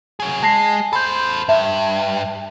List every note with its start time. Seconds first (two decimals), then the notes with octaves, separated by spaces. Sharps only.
0.20 F#3 G#4
0.43 G#3 A5 A#6 C7
0.93 A4 C5 B5 G6
1.49 G2 E5